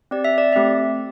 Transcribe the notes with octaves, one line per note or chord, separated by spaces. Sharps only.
C4 G4 D5
E5
D5
A3 C4 G4 E5